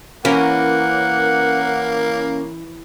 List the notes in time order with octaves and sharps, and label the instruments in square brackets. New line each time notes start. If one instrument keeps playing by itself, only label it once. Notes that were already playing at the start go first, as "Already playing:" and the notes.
[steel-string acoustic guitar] E3 [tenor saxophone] A#3 [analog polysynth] C#4 A#4 [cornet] F#5